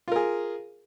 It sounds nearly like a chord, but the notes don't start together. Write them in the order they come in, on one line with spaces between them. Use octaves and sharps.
F4 A#4 G#4